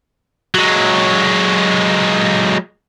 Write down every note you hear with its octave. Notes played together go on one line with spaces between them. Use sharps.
F#3 G#3